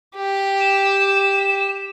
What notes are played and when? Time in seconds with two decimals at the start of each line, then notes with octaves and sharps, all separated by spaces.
0.16 G4
0.60 E7